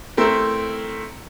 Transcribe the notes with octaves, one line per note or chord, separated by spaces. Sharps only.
A3 C4 E4 A#4